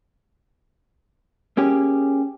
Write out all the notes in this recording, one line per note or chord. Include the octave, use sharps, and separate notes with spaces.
A#3 C#4 G4 G#4